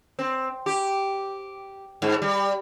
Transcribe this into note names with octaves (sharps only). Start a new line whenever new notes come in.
C4
G4
G#2
G3